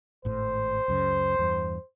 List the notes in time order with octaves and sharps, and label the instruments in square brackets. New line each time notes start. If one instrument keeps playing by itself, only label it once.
[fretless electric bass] G#1 A2 [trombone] C5
[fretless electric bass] C#2 F#2 C#3
E2 G2